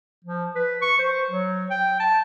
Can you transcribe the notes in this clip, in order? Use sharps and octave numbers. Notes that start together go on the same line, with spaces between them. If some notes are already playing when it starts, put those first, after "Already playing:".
F3
B4
C#6
C5
F#3
G5
A5